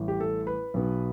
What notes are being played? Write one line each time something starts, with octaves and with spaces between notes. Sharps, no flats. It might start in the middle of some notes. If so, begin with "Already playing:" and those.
Already playing: A1 A2 G3
G4
A4
B4
B1 B2 B3